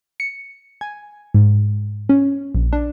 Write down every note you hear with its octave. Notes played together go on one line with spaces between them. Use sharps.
C#7
G#5
G#2
C#4
A#1
D4